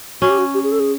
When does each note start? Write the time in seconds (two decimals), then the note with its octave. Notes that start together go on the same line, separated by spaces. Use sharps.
0.22 C#4 F#4
0.30 G4
0.38 F#4
0.54 G4
0.64 G#4
0.72 A4
0.80 G#4